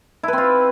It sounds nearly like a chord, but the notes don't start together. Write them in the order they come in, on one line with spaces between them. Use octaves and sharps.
E4 B4 C4 F4